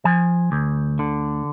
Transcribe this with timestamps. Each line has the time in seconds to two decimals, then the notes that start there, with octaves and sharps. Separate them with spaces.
0.05 F3 G#5
0.52 D2
0.99 D3